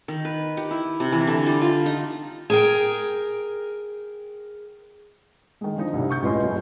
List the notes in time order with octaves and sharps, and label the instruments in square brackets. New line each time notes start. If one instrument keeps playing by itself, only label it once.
[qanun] D#3
B4
G4
E4
C3
E3
D3
G3
F4
D#4
[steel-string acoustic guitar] G#4 A#4 G5
[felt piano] D#3 G#3
D3 F3 D#4
C2 G2 C3
C#6 G6
C#2 A2 C#4 B4 D#5 C6
F#1